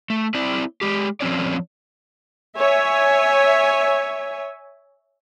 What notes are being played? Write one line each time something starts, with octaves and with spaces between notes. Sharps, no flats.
A3
C4 E4 D5
G#3 G4
F3 C4 C#4 C#5 D5
C#5 E5 G#5